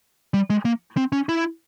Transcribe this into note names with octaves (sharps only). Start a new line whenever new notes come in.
G3
G#3
A#3
C4
C#4
E4